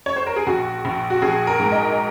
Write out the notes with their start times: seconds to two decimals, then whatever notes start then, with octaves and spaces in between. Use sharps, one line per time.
0.06 C#5
0.16 C5
0.27 A#4
0.36 G#4
0.47 A#1 F#4
0.85 A#1
1.10 F#4
1.22 A#1 G#4
1.47 A#4
1.59 G#2
1.72 D#5